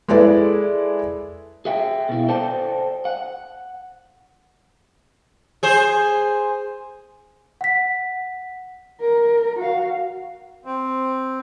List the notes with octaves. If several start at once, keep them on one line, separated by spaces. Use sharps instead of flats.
G#3 E4 G#4 A4 B4 D5
G#4 E5 G5
B2 E4
A4 C5 D5 G5 A5
F#5
G#4 C5
F#5 B6
A#4
F#4 F5
C4